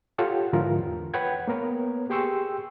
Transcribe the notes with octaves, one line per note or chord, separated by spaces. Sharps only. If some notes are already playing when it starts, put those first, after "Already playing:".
F4 G4 A4 C#5 F#5 G5
G#2 D3 E3 F3 F4 A#4
E2
B4 C#5 F#5 G5 G#6
A#3 B3 A#4 B4 C#5
G4 G#4 G5 C6 C#6 E6